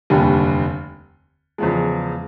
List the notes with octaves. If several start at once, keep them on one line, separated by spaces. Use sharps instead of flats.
F1 D#2 D3 G3
E2 C#3 F3 G#3